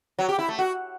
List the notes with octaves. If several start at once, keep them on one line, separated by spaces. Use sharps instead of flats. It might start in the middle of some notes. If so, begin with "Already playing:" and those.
F#3
G4
E4
A3
F#4